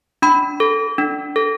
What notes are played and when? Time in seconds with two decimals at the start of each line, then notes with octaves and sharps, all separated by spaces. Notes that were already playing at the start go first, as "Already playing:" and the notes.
0.22 D4 B5
0.60 A4
0.98 D4
1.36 A4